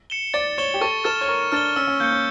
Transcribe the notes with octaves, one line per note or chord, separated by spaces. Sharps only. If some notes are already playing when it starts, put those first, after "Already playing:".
C#7 E7 G7
D5 A6
C#5 C#7 E7 G7
G4
A4 C#6
A4 F6 A6 E7 G7
C#5
A#4 C#6
D4 F6 A6 E7 G7
C#4 E6
C#4
A#3 G6 C#7
C#4